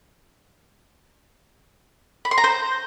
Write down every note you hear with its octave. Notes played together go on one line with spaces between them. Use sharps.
B5
C6
A#5
C5